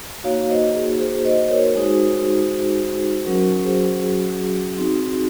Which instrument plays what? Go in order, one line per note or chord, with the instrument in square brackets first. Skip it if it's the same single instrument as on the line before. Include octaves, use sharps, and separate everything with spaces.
[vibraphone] A#3 D#4 F#4 C#5 F5
C5 D#5
G#4
G#4 C5
C5 D#5
A#4 C#5
G#3 D#4 F#4 G#4 C5
F#3 C#4 F#4 A#4
G#4 C5
G#4
C4 D#4 F#4